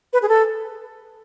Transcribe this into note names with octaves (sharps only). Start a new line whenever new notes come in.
B4
G#4
A4